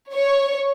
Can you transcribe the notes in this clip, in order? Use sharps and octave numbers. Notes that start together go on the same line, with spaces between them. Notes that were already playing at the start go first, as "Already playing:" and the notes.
C#5